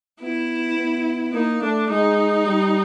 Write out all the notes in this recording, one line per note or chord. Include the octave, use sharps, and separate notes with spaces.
B3 E4
B3
A#3 D#4
A3 D4
G#3 D#4
G3